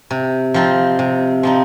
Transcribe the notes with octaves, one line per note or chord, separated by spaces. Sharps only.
C3
F3 C4 D#4
C3
F3 C4 D#4